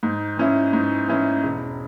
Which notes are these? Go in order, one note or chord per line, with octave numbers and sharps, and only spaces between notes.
G#2
E3 C#4 E4
G#2
E3 C#4 E4
E1